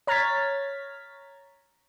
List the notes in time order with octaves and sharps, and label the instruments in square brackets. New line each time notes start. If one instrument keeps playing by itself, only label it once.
[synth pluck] C#5 A#5 F6 G#6 A6 B6